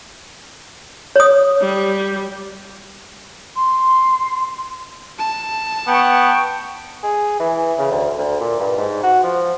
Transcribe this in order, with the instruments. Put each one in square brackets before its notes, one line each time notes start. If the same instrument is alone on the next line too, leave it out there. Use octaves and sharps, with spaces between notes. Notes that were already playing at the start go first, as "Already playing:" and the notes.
[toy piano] C#5 D#6
[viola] G3
[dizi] C6
[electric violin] A5
[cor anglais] B3 [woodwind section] G5 C#6
[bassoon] G#4
E3
C#3
D2
D2
A#2
G2
G#2
F#4
F3